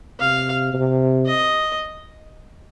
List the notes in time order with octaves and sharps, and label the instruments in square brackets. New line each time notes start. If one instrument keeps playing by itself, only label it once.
[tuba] C3 [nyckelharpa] F5
[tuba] C3
[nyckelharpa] D#5